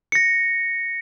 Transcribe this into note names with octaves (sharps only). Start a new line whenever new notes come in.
A#6 C#7